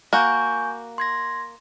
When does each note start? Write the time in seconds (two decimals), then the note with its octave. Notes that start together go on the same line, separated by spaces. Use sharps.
0.13 A#3 F#4 G#5 C#6 G6
0.98 C6 G#6 A#6